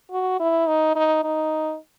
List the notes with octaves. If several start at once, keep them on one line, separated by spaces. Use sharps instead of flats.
F#4
E4
D#4
D#4
D#4